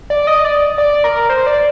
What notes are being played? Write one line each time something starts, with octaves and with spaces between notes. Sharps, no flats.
D5
D#5
D5
D5
A#4
C5
D5